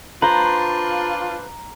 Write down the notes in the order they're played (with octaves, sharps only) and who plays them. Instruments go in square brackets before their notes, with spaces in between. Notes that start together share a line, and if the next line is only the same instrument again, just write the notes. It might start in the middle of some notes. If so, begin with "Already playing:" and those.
[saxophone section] D4 F4 [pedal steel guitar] B4 C5 [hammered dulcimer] A#5